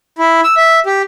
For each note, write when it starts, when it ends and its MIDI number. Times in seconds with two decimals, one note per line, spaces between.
0.19 0.41 64
0.44 0.55 88
0.57 0.79 76
0.86 1.02 67